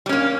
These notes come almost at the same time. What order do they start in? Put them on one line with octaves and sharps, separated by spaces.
G3 C#4 A#3